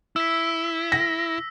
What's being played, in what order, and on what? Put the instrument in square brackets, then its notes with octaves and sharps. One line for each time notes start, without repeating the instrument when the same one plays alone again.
[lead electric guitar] E4 [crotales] E6 B6
[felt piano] A#6